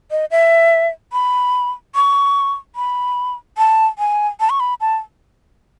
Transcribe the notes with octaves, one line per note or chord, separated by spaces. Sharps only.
D#5
E5
B5
C#6
B5
A5
G#5
A5
C#6
B5
A5